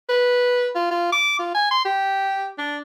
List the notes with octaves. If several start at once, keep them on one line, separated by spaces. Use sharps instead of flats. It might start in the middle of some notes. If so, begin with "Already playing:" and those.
B4
F4
F4
D6
F4
G#5
C6
G4
D4